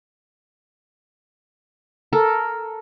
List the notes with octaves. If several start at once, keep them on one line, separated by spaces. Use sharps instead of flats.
A4 A#4